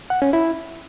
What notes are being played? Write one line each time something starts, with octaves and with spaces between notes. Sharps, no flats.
F#5
C#4
E4